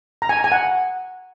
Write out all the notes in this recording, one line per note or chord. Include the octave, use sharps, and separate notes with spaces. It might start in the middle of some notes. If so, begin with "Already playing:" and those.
A#5
G#5
A#5
G#5
F#5